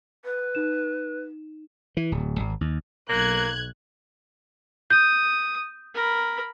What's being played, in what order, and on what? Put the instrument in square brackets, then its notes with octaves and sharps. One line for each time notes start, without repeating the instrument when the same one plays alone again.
[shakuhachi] B4
[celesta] D#4 E7
[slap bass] E3
D1
G#1
D#2
[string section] B1 F#6 G#6 [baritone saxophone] A#3
[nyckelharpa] D#6 [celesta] G6
[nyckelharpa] A#4 B5